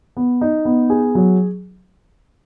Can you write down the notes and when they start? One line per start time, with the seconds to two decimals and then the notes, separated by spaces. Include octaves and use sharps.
0.17 B3
0.41 D#4
0.65 B3
0.90 G#4
1.15 F#3